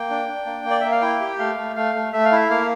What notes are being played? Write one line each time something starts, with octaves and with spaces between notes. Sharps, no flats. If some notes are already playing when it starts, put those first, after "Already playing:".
Already playing: A#3 G5
D4
D4
A#3
A#3
D5
A#3 E5
F5
E4 G5
G4
A3 F5
A3
A3 F5
A3
A3 E5
F5
E4 E5
A#3 F5